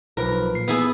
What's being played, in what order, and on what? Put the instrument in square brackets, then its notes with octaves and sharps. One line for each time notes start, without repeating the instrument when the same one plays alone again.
[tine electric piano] B1 F3 B4 [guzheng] A#4
[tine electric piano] A#2 C7
[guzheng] B3 E4 G#4